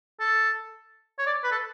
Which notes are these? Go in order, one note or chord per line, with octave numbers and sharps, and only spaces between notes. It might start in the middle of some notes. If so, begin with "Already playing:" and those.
A4
C#5
D5
B4
A4